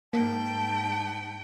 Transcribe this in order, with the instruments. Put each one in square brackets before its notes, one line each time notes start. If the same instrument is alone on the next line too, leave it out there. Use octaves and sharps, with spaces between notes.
[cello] G#2 G5 [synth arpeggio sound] A#3 [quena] A5